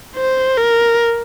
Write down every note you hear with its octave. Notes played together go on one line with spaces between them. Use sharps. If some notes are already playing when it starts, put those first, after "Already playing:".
C5
A#4